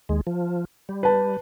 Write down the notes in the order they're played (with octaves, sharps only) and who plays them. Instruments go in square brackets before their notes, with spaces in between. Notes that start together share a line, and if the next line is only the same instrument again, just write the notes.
[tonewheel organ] D#2 G#3
F3
G3
[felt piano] B4 A5